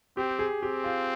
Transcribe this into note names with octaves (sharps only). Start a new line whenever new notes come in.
C4 G4
G#4
C4 G4
F4